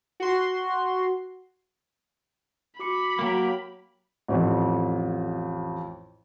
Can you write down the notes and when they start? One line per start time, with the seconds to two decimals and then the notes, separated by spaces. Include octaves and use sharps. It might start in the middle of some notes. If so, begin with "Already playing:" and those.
0.20 F#4 C6
2.79 F#4 B5 D6 C#7
3.19 F#3 A#3 G4 A#4
4.28 A1 F2